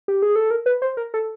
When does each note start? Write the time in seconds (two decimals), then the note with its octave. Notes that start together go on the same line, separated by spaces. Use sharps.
0.08 G4
0.22 G#4
0.36 A4
0.51 A#4
0.66 B4
0.82 C5
0.97 A#4
1.14 A4